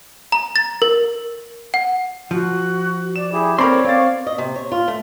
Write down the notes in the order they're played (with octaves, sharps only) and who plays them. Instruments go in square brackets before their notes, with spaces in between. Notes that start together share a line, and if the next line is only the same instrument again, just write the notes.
[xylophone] A#5
A6
A#4
F#5
[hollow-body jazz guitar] F3 [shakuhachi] F#4
[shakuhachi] D5 [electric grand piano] E7
[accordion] E4 G4 [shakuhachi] G#4
[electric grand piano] C4 [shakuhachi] A4 [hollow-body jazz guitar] A#4 B5 C6 [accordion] C#5 D5 D6
[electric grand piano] C4 A6 [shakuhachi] F5
[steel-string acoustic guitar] D#5
C3
C#5
F4
A3